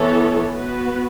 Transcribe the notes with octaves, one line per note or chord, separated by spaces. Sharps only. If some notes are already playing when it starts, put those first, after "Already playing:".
Already playing: E3 B3 E4 A4 C#5
B3 F#4 B4